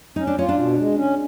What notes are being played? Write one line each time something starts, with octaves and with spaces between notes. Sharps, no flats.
C#4 D#4
D4
C#4 F4
D4
B2
G#3
C#4